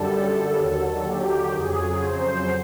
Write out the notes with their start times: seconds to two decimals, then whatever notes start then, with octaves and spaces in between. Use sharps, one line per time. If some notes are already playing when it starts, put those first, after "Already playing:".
Already playing: F#2 D3 G3 A4
0.57 D#2 D3 F#3
1.05 G4
1.53 F2 C#3 F#3 G#4
2.01 C5